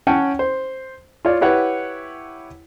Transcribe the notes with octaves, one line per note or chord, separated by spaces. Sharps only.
C#4 C#5 F#5 G5 A5
C5
F4 C#5 D5
E4 G4 B4 C#5 F#5